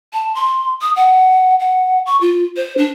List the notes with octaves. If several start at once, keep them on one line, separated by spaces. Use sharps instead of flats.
A5
C6
D#6
F#5
F#5
C#6
F4
C5
D4